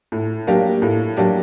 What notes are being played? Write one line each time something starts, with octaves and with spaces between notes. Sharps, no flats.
A2
F#3 A#3 D4 G4
A2
F#3 A#3 D4 G4